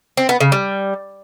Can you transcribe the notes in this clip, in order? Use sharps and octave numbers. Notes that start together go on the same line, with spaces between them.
C4
B3
C#3
G3